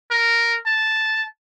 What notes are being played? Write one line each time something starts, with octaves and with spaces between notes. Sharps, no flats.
A#4
A5